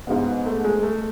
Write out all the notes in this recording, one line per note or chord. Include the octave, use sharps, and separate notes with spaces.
G#2 G#3 B3
A3
G#3
A3